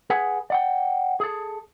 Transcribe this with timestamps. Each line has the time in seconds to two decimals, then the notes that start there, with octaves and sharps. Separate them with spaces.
0.10 G#4 B4 F#5 G#5
0.50 D5 F#5 G5
1.20 G#4 A4